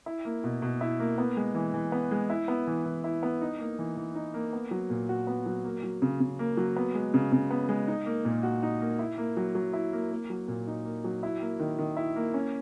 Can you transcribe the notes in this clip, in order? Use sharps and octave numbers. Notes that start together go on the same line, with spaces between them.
E4
A#3
B2
B2
E4
A#3
B3
G#3
E3
E3
B3
G#3
E4
B3
E3
E3
E4
B3
D#4
A#3
E3
E3
D#4
A#3
B3
F#3
A#2
F#4
B3
F#3
A#3
F#3
C#3
C#3
A#3
F#3
B3
G#3
C#3
C#3
B3
G#3
D#4
A#3
A#2
F#4
D#4
A#3
E4
A#3
F#3
F#3
E4
A#3
A#3
F#3
A#2
D#4
A#3
F#3
E4
A#3
D#3
D#3
E4
A#3
C#4